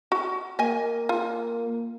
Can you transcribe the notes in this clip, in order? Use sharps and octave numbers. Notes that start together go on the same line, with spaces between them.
F#4
A#3 D#5 G#5
F4